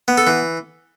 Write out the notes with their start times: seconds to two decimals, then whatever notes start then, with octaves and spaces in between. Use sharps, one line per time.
0.08 B3
0.18 A4
0.27 E3